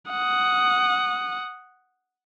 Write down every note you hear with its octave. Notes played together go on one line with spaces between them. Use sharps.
F#5 D#6